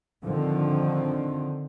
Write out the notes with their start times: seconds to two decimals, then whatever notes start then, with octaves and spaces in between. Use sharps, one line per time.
0.23 D3 D#3 F3 C4